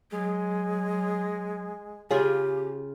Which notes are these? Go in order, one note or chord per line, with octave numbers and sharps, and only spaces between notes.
F#3 G#3
C#3 F4 G4 G#4 G5